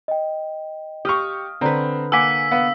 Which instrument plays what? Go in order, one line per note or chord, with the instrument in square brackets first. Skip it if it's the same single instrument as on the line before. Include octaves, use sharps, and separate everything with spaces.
[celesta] D#5 G5
[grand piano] G4 C#6 [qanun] D#5 F5 [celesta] D#6 F6
[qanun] D3 B4 [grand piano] C4 A#5
[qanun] A#3 [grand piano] F#5 G#5 D6 [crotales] E6 B6
[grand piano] B3 [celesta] F5